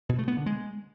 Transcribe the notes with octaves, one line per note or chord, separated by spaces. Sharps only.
B2
A3
B3
D3
G#3